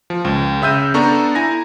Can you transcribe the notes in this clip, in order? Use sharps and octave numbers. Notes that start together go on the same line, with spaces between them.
F3
C#2
C#3 E5 E6 G6 D#7
B3 D4 A4 A#5 C#6 G6
E4 G#5 A#5 A#6